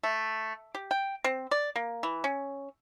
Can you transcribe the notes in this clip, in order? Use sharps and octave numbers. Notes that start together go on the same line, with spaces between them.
A3
G4
G5
C4
D5
A#3
E3
C#4